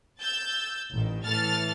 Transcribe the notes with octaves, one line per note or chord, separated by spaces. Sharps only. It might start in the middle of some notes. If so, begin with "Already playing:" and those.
E6 G6 A6
A1 D#3
A2 E3 A4 F6 A6